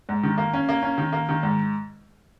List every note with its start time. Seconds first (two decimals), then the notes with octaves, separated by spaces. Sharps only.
0.09 G#2
0.23 D#3
0.38 A#3
0.54 C#4
0.69 A#3
0.83 C#4
0.98 D#3
1.13 A#3
1.29 D#3
1.43 G#2